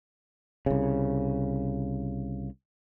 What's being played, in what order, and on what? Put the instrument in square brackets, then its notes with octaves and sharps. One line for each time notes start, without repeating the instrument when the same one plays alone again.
[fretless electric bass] C2 C#3